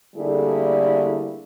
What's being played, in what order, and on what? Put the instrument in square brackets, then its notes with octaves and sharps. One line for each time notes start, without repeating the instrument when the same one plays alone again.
[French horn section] D3 G3 A3 A#3 E4 G#4